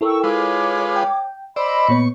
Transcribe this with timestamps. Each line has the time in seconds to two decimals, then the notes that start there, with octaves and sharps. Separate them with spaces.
0.01 E4 A4 A#4 G5 C#6 E6
0.24 G#3 F4 B4 C#5 D6
0.96 G5
1.56 C5 D5 D#5 B5 D6 E6
1.89 A#2 B3 C#5 C#6